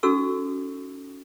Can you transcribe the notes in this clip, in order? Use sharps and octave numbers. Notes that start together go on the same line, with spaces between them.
C#4 D#4 F#4 A4 C#6 E6